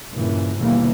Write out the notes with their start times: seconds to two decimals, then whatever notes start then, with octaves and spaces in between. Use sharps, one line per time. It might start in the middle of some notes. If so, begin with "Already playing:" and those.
0.12 G2 A#2 C#3 E3
0.59 D#2 B2 D3 E3 G3 A#3